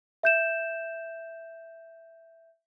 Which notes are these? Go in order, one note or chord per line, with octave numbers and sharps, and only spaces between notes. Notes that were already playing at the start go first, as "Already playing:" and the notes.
E5 G6 E7